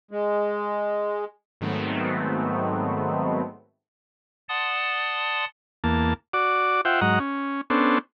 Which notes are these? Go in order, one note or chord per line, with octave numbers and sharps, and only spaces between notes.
G#3
G#2 D#3 F#3 A3 B3 C4
D5 F#5 A5 C6 D#6
E2 A#3 A5
F#4 D5 D6
F4 C5 E5 F#5 G5
G#2 F#3 D#5 F#5 A#5
C#4
B3 C#4 D4 A4 C5